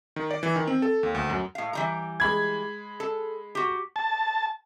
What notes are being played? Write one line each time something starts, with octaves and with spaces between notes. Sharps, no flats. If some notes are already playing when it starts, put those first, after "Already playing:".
D#3
D5
E3
D#3
C4
A4
D#2
D2
F#2
A2 F5
E3 G3 A#5
G#3 B5 G#6
A4
F#4 G4
A5